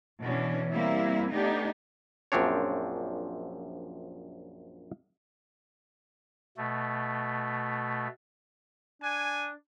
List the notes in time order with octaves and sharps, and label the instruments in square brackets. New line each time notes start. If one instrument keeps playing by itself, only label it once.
[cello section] B2 E3 C#4 D4
G3 A#3 C4 E4
A3 B3 D4 D#4 G4
[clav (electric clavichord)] A#1 F#2 F3 C4 D4 C#5
[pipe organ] B2 A3
[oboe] D4 [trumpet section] G#5